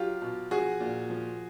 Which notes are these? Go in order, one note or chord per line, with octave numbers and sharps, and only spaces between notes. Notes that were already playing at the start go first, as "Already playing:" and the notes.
Already playing: F#3 F4 G4
B2
F3 F#4 G#4
A#2
F3